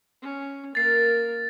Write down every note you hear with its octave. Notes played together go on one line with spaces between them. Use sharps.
C#4
A#3 A#4 A6 C7